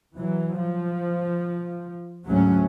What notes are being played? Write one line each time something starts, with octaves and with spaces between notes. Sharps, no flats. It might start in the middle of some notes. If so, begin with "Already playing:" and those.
E3 F#3
F3
D2 G#2 F#3 A3 C#4